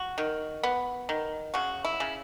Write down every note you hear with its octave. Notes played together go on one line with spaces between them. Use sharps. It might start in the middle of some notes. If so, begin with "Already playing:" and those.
Already playing: F#4
D#3
B3
D#3
C#3 F#4
E4
C#3